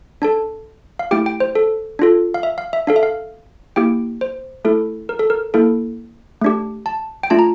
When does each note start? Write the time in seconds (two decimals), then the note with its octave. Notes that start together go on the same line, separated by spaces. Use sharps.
0.22 D4 A4 A5
0.99 F5
1.11 A3 E4 G4 G5
1.26 G5
1.40 C5
1.55 A4
1.99 D4 F4 A4
2.34 F5
2.43 E5
2.58 F5
2.73 E5
2.87 D4 A4 F5
2.96 E5
3.03 F5
3.76 A#3 E4 G4 G5
4.21 C5
4.65 A3 E4 A4
5.09 A#4
5.19 A4
5.30 A#4
5.54 A#3 E4 A4
6.41 A3 D4 G4
6.86 A5
7.23 G5
7.30 A3 D4 F4 A5
7.39 A#5